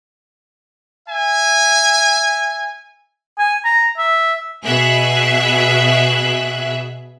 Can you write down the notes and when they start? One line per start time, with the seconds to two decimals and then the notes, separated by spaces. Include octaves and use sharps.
1.07 E5 G#5
3.38 G#5
3.65 A#5
3.98 E5
4.64 B2 G#4 E5 F#6